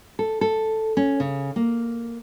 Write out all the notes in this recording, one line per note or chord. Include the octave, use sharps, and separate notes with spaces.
A4
A4
C#4
C#3
A#3